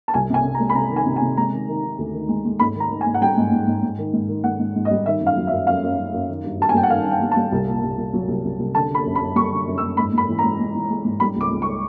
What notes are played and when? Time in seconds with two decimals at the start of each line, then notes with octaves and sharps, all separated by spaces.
0.08 A5
0.14 C2 G#5
0.30 C3 G#5
0.44 C3
0.55 A#5
0.60 G#3
0.70 B5
0.75 C3 A#5
0.91 D#3
0.96 G#5
1.06 C3
1.16 G#5
1.21 C3
1.37 G#3 A#5
1.53 D#3
1.68 D#3
1.84 D#3
1.98 D2
2.13 D#3
2.29 G#3
2.45 G#3
2.60 G#2 B5
2.76 D#3 A#5
2.90 D#3
3.01 G#5
3.06 G#2
3.14 F#5
3.21 G3 G5
3.37 G#2
3.52 G#2
3.67 G#2
3.82 G#2
3.98 D#3
4.13 G#2
4.28 D#3
4.44 G#2 F#5
4.59 G#2
4.76 G#2
4.85 D#5
4.91 G3
5.06 D#3 E5
5.21 F#2
5.27 F5
5.37 F#3
5.47 E5
5.52 F#2
5.67 F#2 F5
5.83 F#2
5.97 F#2
6.13 F#2
6.29 D#3
6.44 G2
6.60 G2 A5
6.69 G#5
6.74 G3 G5
6.83 F#5
6.90 D#3 F5
7.05 G2
7.11 G5
7.21 G3
7.32 A5
7.37 G3
7.52 C2
7.66 A#2
7.83 C2
7.98 C2
8.13 F#3
8.28 C2
8.45 C2
8.59 C2
8.75 D3 A5
8.91 D3 B5
9.05 F#2
9.15 B5
9.21 F#2
9.36 G3 C#6
9.52 D3
9.67 F#2
9.78 E6
9.82 F#2
9.97 G#2 B5
10.13 G#2 B5
10.29 E3
10.39 G#3 A#5
10.59 G#3
10.75 E3
10.90 G#3
11.05 G#2
11.20 G3 B5
11.36 C#2 D6
11.51 C#2
11.62 C#6